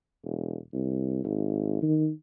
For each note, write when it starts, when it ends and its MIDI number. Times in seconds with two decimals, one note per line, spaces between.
0.24 0.57 28
0.73 1.24 36
1.24 1.80 32
1.82 2.09 51